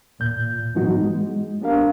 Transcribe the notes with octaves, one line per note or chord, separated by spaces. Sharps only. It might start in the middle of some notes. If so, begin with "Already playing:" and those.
D#2 A#2 G6
G#2 E3 F#3 B3 D#4 F#4
G#3
B3 D4 G4 A#4 F5